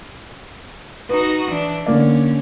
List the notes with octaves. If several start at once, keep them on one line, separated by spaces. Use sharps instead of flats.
D#4 F#4 B4 D#6
E3 D4
D3 A#3 C#4 D5